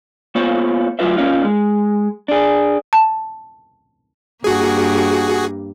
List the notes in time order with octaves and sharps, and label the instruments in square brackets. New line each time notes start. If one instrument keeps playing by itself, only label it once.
[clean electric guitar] A#3 B3 F4 C5 C#5
D2 A2 F#3 F4 B4 E5
A#3 C#4 D#4 F4
G#3
D4 G#4
[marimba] A5
[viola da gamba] G2 A#3 [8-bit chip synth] F#4 G#4